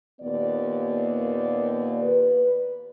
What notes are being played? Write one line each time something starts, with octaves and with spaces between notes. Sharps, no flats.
D#2 A#2 B3 D5
B4